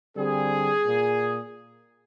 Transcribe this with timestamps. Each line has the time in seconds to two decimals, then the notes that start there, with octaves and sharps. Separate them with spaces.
0.16 D3 G3 C4 G#4
0.86 A#2